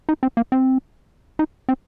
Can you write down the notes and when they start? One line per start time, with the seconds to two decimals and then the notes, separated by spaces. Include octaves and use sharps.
0.09 D#4
0.23 C4
0.37 A#3
0.52 C4
1.39 D#4
1.69 C4